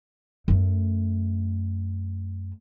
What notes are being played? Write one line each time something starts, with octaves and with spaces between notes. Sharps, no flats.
F#2 A3